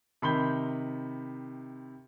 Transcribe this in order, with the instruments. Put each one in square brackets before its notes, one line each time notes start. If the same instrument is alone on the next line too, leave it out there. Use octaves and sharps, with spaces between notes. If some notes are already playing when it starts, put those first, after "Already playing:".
[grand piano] C3 D#3 B5 C6 G6 G7